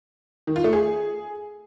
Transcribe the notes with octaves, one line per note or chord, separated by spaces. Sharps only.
D#3
F4
A3
G#4